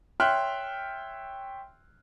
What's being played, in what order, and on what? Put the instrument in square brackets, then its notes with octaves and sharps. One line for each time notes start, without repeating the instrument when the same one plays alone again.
[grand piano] C#5 E5 G5 C6 F6 F#6